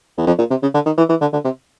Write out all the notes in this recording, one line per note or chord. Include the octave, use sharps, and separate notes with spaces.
E2
F2
A#2
C3
C#3
D3
D#3
E3
E3
D3
D3
C3